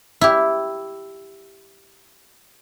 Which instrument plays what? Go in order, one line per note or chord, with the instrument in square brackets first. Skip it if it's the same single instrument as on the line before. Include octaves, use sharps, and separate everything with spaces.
[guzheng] E4 G4